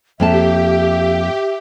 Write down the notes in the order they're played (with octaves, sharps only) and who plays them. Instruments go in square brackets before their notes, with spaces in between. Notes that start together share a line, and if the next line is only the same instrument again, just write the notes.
[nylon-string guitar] F2 A#3 A5 [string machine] G4 [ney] E5